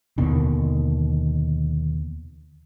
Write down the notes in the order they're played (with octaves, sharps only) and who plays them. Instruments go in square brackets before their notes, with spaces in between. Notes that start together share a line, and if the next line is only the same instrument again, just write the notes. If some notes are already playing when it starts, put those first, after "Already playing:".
[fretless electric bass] D#2 B2 D3 D#3